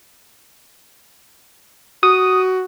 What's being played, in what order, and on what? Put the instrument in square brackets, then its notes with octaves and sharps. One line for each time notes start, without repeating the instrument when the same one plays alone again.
[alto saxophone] F#4 [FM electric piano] D#6